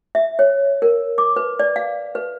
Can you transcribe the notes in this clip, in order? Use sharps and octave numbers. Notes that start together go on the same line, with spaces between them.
E5
C#5
A#4
D6
B4
D5
F5
B4